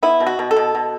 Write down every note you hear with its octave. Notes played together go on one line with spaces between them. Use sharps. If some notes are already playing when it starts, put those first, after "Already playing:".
B3 E4
B2
F#4
B2
A4
B2
B2